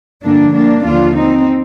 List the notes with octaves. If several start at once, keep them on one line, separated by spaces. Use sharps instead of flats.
G2 D3 F3 A#3 D4
A#3 D4
D#2 D3 F3 D4 F4
C4 D#4